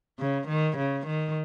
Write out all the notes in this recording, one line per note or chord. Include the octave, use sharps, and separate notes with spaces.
C#3
D#3
C#3
D#3